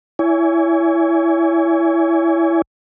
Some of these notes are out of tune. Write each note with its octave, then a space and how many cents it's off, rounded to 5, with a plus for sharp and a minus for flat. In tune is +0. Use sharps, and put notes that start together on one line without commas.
E4 +10 C#5 +40 G#5 +0